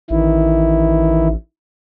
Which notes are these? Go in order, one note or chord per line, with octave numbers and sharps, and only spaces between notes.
A1 D#3 E3 E4